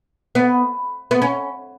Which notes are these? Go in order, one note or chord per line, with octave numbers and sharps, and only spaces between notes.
B3
B3
C#4